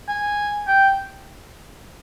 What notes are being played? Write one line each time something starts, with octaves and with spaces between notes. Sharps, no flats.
G#5
G5